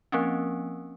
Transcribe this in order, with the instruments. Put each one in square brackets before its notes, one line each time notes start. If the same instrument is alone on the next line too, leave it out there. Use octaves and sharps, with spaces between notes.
[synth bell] F3 A#3 C4 C#4